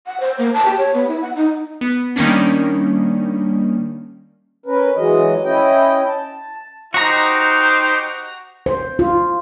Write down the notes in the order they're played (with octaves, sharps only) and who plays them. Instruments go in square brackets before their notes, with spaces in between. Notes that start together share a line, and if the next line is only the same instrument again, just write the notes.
[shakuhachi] F#5
C5
A#3
A5
G4
C#5
B3
E4
F#5
D#4
[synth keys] B3
D#3 G3 A#3 C#4 D4
[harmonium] C#4 A#4 B4
E3 F#3 G#3 D#5
C#4 E4 D#5 G5
A5
[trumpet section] D#4 G4 C5 [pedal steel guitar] F#4 A#5
[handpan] C5
F4